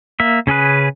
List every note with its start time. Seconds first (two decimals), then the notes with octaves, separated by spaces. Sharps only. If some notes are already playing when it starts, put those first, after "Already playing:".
0.20 A#3 E5
0.47 C#3 C#4 G#4 B4